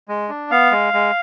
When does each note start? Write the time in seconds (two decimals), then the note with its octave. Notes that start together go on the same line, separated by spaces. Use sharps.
0.09 G#3
0.29 D4
0.51 B3 F5
0.72 G#3
0.94 G#3